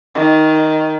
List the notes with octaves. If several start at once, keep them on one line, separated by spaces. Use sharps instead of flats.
D#3